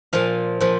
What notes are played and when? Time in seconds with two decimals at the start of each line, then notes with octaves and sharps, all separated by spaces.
0.13 A#2 F3 F5
0.61 A#2 F3